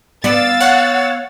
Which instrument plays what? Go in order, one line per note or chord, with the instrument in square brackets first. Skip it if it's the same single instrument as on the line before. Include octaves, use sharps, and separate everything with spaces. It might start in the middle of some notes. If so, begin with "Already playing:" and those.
[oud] B3 [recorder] D5 [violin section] F5 E6 A6
[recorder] C#5 [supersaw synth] F#5